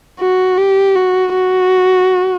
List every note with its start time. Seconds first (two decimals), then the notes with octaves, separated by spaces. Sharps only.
0.20 F#4
0.58 G4
0.95 F#4
1.34 F#4